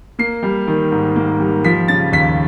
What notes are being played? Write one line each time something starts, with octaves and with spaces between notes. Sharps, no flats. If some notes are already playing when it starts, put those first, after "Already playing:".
A#3 C7
G3
D#3
G#2
A#3
G3
F3 B6
C#3 A6
D#2 B6